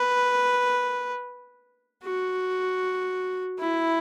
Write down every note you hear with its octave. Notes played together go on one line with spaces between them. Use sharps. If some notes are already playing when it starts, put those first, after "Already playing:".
Already playing: B4
F#4
E4